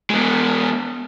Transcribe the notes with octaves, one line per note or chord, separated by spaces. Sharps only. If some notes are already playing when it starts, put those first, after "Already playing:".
G#3 B3